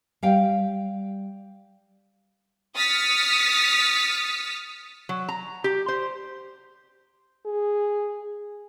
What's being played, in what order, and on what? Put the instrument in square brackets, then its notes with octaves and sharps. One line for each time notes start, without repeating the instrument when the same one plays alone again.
[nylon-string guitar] G3 F5 G5
[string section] D#6 F6 A6 B6 C#7
[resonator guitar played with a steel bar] F#3
A#5
G4
C5
[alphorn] G#4